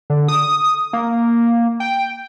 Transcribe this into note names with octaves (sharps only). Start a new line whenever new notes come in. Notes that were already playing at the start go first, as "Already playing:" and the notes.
D3
D#6
A#3
G5